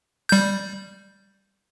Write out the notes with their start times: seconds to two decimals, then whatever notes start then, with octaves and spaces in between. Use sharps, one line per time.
0.29 G3 G6